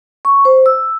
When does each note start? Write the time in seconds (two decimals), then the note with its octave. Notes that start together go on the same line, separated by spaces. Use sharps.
0.25 C#6
0.45 C5
0.66 E6